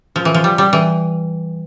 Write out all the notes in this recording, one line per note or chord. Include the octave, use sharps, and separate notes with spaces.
F3
E3
F3
G3
G3
E3